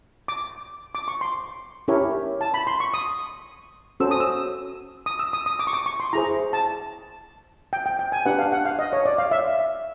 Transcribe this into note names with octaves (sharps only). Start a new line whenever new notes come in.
D6
D6
C#6
C6
C#4 E4 G4 A#4 C#5
A5
B5
C6
C#6
D#6
C#4 F#4 A4 C5 E6
D#6
E6
D#6
E6
D#6
D#6
D6
C#6
D6
C#6
C6
E4 G#4 C5 A#5
A5
G5
G5
G5
G#5
D4 G4 B4 F#5
F5
F#5
F5
D#5
C#5
D5
F5
E5